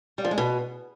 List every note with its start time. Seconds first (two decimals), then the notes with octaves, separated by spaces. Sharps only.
0.18 G3
0.25 F3
0.31 G#3
0.38 B2